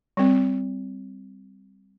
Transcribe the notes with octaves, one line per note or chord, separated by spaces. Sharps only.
G3 C4